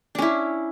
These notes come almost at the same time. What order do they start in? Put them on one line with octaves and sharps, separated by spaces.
D4 C#4 E4